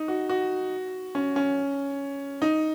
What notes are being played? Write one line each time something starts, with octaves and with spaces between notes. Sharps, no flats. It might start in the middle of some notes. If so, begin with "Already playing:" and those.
Already playing: D#4
F#4
F#4
C#4
C#4
D#4